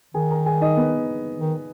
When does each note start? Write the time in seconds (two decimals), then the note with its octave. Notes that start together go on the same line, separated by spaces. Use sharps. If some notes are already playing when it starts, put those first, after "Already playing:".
0.14 D#3 G#4 G#5
0.31 A#4 A#5
0.46 G#4 G#5
0.61 D#4 D#5
0.77 B3 B4
1.39 D#3